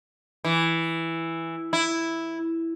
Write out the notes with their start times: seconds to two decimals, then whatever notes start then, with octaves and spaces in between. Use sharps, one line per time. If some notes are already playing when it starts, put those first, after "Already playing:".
0.45 E3
1.73 E4